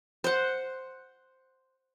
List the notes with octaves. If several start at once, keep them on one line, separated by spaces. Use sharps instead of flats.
C5 F#5